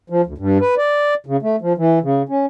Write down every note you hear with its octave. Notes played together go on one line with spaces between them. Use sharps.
F3
D2
G2
B4
D5
C#3
A3
F3
E3
C#3
C#4